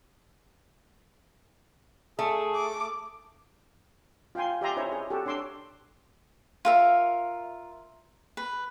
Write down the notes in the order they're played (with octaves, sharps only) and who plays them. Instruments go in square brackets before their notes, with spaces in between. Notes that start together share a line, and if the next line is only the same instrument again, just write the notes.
[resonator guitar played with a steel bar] A3 [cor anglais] G#4
[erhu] D6
[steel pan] F4 F5 G5 G#5 C6
G4 D5 E5 G#5 A#5 C6
D#4 E4 C5 C#5 E5
G#4
F#4 G4 A4
D4 C#5 C6 D6 E6
[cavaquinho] F4 A#4 E5
B4